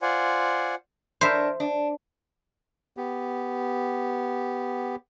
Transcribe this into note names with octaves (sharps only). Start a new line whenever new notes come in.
F4 C5 D5 F#5 G#5
D4 A#4 C5 C#5 E5
D4
B3 G4